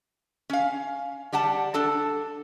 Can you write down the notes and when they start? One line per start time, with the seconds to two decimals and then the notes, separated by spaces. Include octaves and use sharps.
0.50 C#4 F5
1.33 G3 G4 F#5 A5
1.74 D4 A4 A5